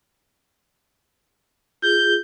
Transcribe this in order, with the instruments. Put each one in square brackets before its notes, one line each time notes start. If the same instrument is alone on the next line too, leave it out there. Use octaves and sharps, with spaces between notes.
[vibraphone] F4 G#4 [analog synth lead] G6